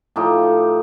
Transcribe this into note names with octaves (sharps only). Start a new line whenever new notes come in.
A2 F3 D#4 G4